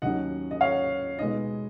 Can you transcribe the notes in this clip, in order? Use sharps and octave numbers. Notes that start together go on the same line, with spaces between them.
D#2 D#3 F#3 C#4 D#5 F#5
D#5
C#5 F5
B2 G#3 B3 D#4 D#5